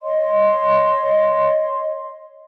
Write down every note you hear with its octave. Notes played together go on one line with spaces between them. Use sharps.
C#5 D#5 C6